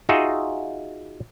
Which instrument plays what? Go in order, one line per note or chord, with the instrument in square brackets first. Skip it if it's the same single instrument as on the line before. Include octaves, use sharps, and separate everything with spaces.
[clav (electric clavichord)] D#4 F4 F#4 G#4 D#5 E5